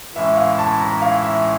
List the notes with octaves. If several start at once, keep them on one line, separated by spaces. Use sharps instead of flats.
A2 E3 G#3 C#4 E4 E5
F5
A5
A#5
F5
E5